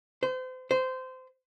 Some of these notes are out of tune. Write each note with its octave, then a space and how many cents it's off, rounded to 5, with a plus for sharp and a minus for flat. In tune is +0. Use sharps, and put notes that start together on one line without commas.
C5 -35
C5 -20